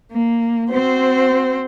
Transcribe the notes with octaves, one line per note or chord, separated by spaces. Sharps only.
A#3
C4 F#4 C5